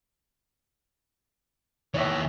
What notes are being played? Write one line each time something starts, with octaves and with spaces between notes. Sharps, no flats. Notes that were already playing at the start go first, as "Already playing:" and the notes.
D#2 E3 C#5 E5